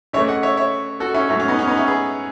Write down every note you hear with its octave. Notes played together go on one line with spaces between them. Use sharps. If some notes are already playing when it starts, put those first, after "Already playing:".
C#3 E3 A3 C#5 E5
D#5 F#5
C#5 E5
C#5 E5
F#4 A4
C#4 E4
G#2 F#3 A3 C#4 E4
C#4
B3 D#4
C#4
B3 D#4
C#4 E4
G#4 B4